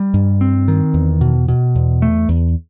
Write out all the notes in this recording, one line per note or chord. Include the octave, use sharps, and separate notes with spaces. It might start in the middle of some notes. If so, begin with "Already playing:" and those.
Already playing: G3
G2
C4
D#3
E2
B2
B2
E2
A3
E2